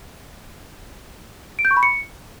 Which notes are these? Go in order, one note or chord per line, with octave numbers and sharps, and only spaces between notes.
D7
G6
C#6
B5
C#7